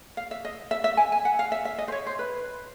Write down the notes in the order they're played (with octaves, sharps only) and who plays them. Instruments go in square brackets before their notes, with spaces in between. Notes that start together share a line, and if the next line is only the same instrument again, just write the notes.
[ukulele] F5
E5
D#5
E5
E5
G#5
G#5
F#5
F5
E5
E5
D#5
C5
C#5
C5
B4